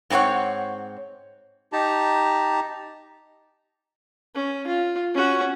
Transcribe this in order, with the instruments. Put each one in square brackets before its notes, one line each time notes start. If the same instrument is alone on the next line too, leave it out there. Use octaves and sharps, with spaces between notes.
[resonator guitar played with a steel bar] G#2 C4 D#4 C#5 F#5
[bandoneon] D#4 G4 A5 A#5
[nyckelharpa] C#4
F4
C#4 F#4